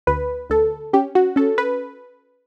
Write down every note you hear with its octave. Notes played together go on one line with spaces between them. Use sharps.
D2 B4
D2 A4
C#4 G4
F#4
C#4 A4
B4